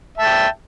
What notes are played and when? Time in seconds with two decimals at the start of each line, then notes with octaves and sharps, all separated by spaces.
0.18 E5
0.20 A5
0.23 G5